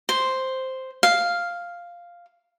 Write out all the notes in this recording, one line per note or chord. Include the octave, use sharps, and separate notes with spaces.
C5
F5